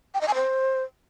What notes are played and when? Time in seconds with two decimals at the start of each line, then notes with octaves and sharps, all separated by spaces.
0.14 G5
0.21 D#5
0.28 G#5
0.35 C5